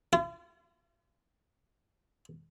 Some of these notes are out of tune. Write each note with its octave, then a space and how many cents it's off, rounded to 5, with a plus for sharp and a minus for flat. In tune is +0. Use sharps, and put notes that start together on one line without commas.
F4 -45